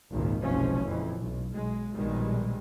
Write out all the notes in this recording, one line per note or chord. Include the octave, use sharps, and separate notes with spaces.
G#1 C#2 A#2 D#3
F#1 B1 C3 F3 G#3 C#4
F2 A#2 E3
B1
B1 G#3
A#1 B2 D#3 G3 G#3